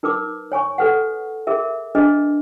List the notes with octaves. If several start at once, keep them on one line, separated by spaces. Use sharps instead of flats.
D#4 A#4 B4 D6
C#5 G#5 C#6
A4 B4 F#5
G#4 A#4 E5
D4 G#4 B4 D#5